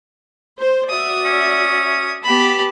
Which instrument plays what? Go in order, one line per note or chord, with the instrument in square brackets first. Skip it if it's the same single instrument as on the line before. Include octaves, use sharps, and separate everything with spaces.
[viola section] C5
[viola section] F#4 D5 E5 [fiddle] D#6
[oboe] C#4
[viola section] B3 A5 [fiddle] G4 B5